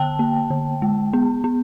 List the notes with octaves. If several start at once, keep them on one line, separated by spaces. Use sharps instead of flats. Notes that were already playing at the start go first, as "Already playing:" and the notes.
Already playing: D3 G5 A5
A#3
D3
G#3
B3
B3